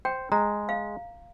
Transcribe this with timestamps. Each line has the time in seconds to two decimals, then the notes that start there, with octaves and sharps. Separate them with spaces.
0.05 C5 G5
0.32 G#3 A#5
0.69 F5